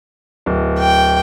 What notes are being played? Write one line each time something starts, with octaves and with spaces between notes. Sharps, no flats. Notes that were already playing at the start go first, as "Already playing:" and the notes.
D1
G5